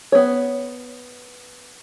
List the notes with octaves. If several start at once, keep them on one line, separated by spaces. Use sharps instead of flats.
B3 C#5